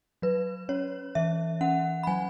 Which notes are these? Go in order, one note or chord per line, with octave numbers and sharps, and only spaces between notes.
F#3 B4
C#4 C#5
E3 E5
C#4 F#5
B5
F#3 G#5